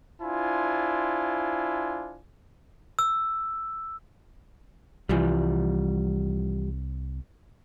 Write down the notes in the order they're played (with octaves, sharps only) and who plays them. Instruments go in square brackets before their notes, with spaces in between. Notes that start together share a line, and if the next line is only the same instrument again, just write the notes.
[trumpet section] D4 E4 F4 C5 G#5
[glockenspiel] E6
[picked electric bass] C2 [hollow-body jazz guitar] E3 F3 G3